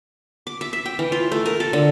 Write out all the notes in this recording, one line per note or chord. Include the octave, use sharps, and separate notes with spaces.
D6
E5
E5
G5
E3
F4
A3
A#4
A4
D3